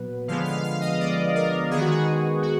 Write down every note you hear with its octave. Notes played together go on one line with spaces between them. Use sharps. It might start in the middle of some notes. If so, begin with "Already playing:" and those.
Already playing: A#2 F#3 B3 B4
D3 F3 G#3 B3 F5
F5
F5
D#5
D5
A#4
D#3 G#3 B3 G#4
F#4
G#4
F#4